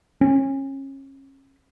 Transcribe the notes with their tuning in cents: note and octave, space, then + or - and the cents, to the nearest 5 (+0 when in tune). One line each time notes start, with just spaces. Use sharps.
C#4 -30